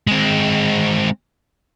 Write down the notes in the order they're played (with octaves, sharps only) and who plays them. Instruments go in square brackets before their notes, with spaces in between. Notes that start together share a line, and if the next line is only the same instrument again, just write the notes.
[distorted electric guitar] G#3 C4